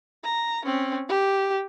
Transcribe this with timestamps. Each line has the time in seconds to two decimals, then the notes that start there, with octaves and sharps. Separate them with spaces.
0.24 A#5
0.65 C4 C#4
1.09 G4